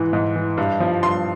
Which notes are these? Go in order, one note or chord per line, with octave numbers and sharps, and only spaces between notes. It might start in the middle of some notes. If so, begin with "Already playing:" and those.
Already playing: G#2 E3
G#2
E3
G2
F3
G2 C6